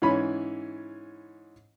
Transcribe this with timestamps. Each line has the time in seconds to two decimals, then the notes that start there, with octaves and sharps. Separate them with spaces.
0.02 G#2 E3 C#4 B5